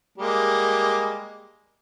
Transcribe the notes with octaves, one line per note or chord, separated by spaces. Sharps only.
G3 G#3 A#3